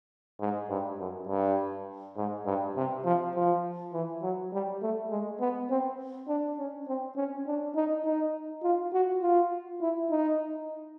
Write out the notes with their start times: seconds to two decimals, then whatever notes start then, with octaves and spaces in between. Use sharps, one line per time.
0.40 G#2
0.69 G2
0.99 F#2
1.28 G2
2.17 G#2
2.46 G2
2.76 C3
3.05 F3
3.35 F3
3.93 E3
4.22 F#3
4.52 G3
4.82 A3
5.11 G#3
5.40 B3
5.70 C4
6.28 D4
6.58 C#4
6.88 C4
7.16 C#4
7.46 D4
7.76 D#4
8.05 D#4
8.63 F4
8.93 F#4
9.22 F4
9.81 E4
10.10 D#4